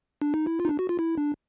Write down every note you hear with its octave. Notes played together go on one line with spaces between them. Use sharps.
D4
D#4
E4
F4
D#4
D4
F#4
F4
E4
D4